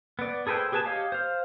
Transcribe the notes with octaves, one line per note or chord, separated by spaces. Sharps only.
B3 D5
G#4 A4 B4 C5 G5
G4 G#4 B4 G#5 A5
G4 C#5 D#5 F5
C5 F5